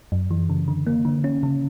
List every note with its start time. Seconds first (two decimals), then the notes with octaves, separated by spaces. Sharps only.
0.12 F#2
0.31 E3
0.50 C#3
0.68 D3
0.87 A#3
1.05 D3
1.24 C#4
1.43 C#3